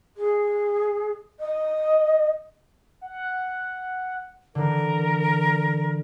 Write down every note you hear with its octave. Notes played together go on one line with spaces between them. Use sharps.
G#4
D#5
F#5
D3 E3 A#4